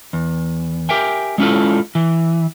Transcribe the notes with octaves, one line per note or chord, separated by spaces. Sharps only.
E2
G4 A#4 E5 G5 G#5
G#3 C#4 E4 F4 A4
E3